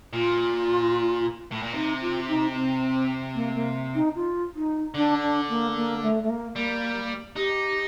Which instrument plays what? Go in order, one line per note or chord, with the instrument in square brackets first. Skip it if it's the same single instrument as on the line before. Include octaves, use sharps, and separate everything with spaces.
[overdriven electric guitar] A#2 [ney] F4
[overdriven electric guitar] A2
A#2
[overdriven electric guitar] C3 [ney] D#4
[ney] F4
D#4
C4
A#3
A#3
D#4
F4
D#4
[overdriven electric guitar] D3 [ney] D4
[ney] D4
A#3
A#3
A3
A3
A#3
[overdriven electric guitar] G3 [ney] A#3
[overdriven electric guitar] D#4 [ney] G4